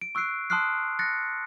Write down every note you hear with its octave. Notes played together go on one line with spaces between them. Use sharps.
D7
C#6 E6 F#6 C7 D7
A5 C6 D#6 F6 F#6 C7
F#6 A6 A#6 C#7